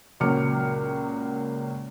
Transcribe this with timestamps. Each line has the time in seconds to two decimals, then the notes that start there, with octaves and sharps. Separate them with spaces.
0.20 C#2 A#2 F#3 D6 F6 C#7